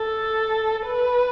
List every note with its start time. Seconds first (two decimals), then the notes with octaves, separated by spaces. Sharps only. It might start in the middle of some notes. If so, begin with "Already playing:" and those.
Already playing: A4
0.86 B4